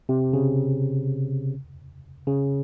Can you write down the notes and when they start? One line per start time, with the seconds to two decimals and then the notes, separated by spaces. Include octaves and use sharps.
0.09 C3
0.33 C#3
2.27 C#3